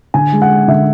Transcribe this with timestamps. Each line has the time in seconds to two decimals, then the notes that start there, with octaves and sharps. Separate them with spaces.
0.14 D3 G#5
0.32 G#3
0.42 F#5
0.49 G#3
0.68 D3 E5